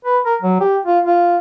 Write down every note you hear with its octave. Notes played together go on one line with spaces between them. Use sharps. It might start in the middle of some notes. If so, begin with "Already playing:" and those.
B4
A#4
F#3
G4
F4
F4